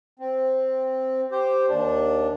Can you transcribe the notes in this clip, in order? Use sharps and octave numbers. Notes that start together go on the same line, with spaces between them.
C4
G4 C5
D#2 D4